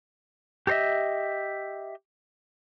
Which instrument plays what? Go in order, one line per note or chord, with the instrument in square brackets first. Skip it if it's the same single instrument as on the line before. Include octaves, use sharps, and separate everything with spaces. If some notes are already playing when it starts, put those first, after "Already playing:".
[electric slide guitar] G4 A4 C5 D#5 E5